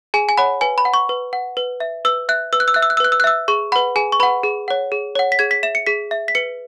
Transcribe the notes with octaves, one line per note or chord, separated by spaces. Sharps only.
G#4 G#5
G#5
C#5 F#5 B5
B4 G#5
B5
F#5
C#6
B4
F#5
B4
E5
B4 E6
E5 F#6
B4 E6
F#6
E6
E5 F#6
E6
F#6
E6
B4 F#6
E6
F#6
E5 E6
G#4 C#6
B4 F#5 B5
G#4 G#5
C#6
B4 F#5 B5
G#4
C#5 F#5
G#4
C#5 F#5
B6
G#4 G#6
B6
E5 E7
C#7
G#4 B6
E5
B6
B4 C#7